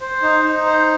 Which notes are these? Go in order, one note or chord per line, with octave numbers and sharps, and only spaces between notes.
C5
D#4
D#4
C5